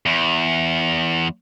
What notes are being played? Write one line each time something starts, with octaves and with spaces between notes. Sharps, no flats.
E2